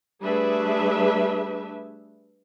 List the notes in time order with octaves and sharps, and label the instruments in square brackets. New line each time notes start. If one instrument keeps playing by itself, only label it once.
[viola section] G3 A3 D4 G#4 B4 E5